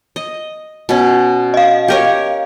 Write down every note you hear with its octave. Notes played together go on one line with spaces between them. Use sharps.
D#5
B2 C#4
D#5 F5
G4 A#4 C#5